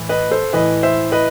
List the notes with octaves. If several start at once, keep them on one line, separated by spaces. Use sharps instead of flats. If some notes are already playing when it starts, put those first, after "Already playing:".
Already playing: A2 E3
B4 D#5
A4 C5
A2 E3 B4 D#5
C5 E5
B4 D#5